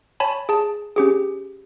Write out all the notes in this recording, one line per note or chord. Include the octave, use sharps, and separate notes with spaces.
C#5 G#5 A5 B5
G#4 A5
C#4 G4 G#4